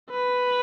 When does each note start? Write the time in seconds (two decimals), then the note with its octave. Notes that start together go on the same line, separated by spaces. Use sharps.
0.10 B4